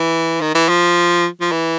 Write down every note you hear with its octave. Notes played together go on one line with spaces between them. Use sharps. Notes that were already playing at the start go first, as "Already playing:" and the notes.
Already playing: E3
D#3
E3
F3
F3
E3